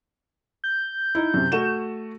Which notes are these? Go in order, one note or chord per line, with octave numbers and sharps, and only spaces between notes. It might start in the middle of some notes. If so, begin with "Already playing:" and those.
G6
D#4 E4
F#2 C3
A3 F#4 E7